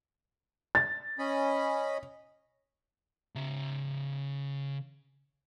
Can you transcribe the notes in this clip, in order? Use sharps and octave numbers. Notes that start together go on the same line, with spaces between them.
A6
C#4 D#5 B5
C#3 E5